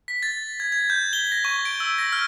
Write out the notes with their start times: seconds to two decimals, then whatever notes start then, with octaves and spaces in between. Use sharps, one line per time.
0.08 B6
0.23 A6
0.60 G#6
0.72 G#6
0.90 G6
1.13 G7
1.32 A#6
1.45 C#6
1.65 D7
1.80 E6
1.98 A#6
2.13 F6